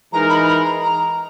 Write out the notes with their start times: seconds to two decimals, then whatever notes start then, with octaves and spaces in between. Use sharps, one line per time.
0.12 E3 G#3 D#4 A#4 A#5
0.29 B5
0.47 B5
0.65 A#5
0.82 A#5